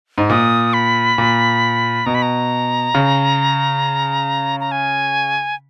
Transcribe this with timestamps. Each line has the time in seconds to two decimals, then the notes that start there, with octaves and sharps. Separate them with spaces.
0.18 G#2
0.29 A#2 D#6
0.73 B5
1.18 A#2
2.06 B2 A#5
2.14 B5
2.22 A#5
2.95 C#3
4.60 A#5
4.72 G#5